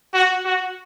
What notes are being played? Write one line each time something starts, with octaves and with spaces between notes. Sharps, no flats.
F#4
F#4